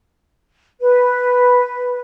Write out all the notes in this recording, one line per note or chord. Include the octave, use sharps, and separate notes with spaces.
B4